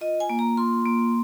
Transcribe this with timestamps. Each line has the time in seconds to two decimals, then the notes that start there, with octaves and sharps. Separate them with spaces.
0.01 F4 D#5
0.20 G#5
0.30 A#3
0.39 A#5
0.57 F4 C6
0.86 A#3